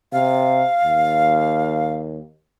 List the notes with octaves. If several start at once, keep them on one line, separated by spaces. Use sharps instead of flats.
C3 F5
D#2